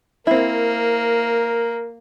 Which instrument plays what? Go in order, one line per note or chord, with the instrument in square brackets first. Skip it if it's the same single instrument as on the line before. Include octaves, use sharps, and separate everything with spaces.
[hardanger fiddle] A#3 [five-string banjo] C4 E4 [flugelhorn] A#4